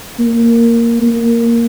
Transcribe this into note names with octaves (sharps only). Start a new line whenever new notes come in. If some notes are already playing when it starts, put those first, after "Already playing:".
A#3
A#3